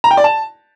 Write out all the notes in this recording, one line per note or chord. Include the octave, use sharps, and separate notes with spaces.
A#5
G5
D5
A5